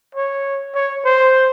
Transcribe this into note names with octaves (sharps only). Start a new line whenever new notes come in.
C#5
C#5
C5